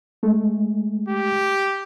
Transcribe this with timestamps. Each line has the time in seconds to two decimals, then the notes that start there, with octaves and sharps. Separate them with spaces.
0.23 G#3 A3
1.09 G4